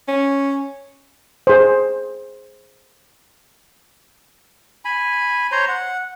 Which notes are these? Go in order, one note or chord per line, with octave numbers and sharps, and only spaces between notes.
C#4
G#4 C5
G#5 B5
C5 C#5 A#5 C6
F#5